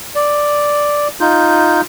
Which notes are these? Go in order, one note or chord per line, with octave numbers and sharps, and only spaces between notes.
D5
D#4 F4 G6